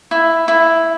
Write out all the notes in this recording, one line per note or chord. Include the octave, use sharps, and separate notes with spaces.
E4
E4